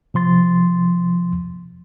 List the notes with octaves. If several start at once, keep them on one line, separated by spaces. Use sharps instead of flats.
C3 F3 C6 A6